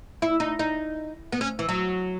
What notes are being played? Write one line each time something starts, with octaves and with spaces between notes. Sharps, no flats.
E4
D#4
D#4
B3
C#4
E3
F#3